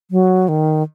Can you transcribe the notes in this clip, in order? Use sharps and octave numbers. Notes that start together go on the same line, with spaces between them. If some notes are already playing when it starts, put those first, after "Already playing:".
F#3
D#3